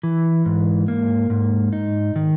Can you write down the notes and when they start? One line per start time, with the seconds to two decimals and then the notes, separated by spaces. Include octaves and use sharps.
0.03 E3
0.46 G#2
0.88 A#3
1.30 G#2
1.73 D#4
2.16 D#3